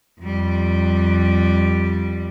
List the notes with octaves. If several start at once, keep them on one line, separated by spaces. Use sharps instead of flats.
F2 G3